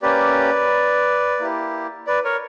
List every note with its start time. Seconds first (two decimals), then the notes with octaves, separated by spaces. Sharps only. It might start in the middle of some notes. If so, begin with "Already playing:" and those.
0.02 A#3 C#4 G4 B4 D5
1.39 A#3 E4 G4
2.07 B4 D5
2.25 A#4 C#5